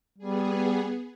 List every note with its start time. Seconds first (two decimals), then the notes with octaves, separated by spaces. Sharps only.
0.18 G3 B3 G#4